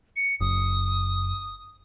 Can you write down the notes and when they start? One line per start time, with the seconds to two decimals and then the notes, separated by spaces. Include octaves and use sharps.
0.16 C#7
0.41 F#1 D#6